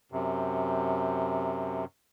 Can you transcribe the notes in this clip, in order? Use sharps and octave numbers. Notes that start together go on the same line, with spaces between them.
F#2 C3